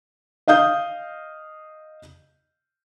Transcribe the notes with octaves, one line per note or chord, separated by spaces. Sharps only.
D#5 F5 D#6 G6